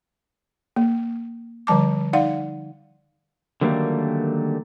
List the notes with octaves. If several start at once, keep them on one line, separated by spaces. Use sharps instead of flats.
A#3
D3 F3 G3 A5 D6
D#4 D5 F5 F#5
D3 D#3 F#3 G3 A3 A#3